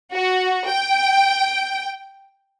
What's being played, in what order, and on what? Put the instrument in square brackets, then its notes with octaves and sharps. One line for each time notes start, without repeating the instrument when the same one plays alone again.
[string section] F#4
G5